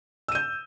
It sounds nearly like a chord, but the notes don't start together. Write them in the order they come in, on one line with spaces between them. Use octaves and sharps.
E6 D#7 G6